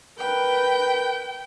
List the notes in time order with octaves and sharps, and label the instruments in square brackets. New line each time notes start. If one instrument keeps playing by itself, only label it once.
[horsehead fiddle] A#4 B4 [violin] G5